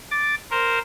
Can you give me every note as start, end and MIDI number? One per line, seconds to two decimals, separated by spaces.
0.11 0.35 86
0.11 0.35 93
0.51 0.79 70
0.51 0.79 72